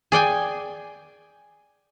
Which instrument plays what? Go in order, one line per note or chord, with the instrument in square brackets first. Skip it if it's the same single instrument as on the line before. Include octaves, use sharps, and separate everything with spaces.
[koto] G#4 D5 G5 G#5